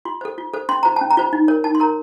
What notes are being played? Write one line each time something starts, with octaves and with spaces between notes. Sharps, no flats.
F4 C6
A4 C5
F4
A4 C5
C#4 C6
F4 C5 A#5
C#4 A5
A#5
F4 C5
D#4
A#4 C#5
D#4 A5
C6
A#4 C#5 A#5